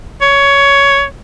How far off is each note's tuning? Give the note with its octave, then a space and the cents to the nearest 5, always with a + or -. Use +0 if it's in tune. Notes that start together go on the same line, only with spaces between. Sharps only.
C#5 +15